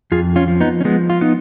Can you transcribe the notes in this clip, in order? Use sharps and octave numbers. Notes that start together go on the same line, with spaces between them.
F2 F4 G#4
C#4 F4
F3
B3 D#4
C#4
F3 G#3 B3
F4
B3 D#4